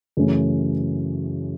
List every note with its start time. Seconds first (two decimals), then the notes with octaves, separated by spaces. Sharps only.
0.17 F#2 C#3 E3 A3 C#4